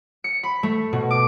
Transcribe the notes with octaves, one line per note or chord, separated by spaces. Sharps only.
C#7
B5
A3
B2
D6